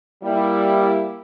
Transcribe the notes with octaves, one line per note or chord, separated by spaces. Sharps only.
G3 A#3 E4